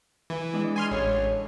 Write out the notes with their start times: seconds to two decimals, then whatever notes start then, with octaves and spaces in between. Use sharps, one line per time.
0.30 E3
0.53 G#3 D4 E4
0.76 G#5 C6 F6
0.91 A1 A4 C#5